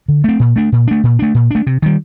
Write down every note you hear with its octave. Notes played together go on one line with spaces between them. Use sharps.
D3
A3 C4
A#2
A3 D4
A#2
A3 D4
A#2
A3 D4
A#2
A3 D4
C3
D#3 G3